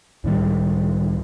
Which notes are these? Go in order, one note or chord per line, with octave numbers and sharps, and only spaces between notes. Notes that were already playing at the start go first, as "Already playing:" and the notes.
C#2 A2 D#3 G3